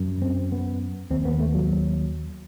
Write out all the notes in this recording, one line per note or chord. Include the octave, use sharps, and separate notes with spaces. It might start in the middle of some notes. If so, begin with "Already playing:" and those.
Already playing: F#2
C4
B3
D#2 C4
B3
A3
F#3